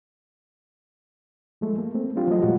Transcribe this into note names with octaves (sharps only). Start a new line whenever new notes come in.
F3 G#3 A3
A#3
A3 C4
F#3 C4 D4 F4 G4
F3 F#3 A3 D#5
A#2 G3 G#3 F4 F#4